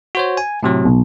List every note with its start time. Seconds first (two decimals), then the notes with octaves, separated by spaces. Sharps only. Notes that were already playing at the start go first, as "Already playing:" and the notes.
0.15 F#4 C5 C#5
0.37 G#5
0.63 A2 C3 F#3
0.85 B1